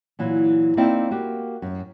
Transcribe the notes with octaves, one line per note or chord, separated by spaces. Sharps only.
A#2 E3 F#3
A#3 C4 D#4 E4 D5 G5
A#3 F#4 G4
F#2